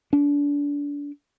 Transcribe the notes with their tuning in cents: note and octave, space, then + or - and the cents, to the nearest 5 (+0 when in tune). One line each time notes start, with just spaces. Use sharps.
D4 -30